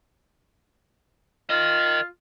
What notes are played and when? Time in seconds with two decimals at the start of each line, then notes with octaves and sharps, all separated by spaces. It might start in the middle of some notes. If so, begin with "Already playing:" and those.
1.50 F4 A#4 D#5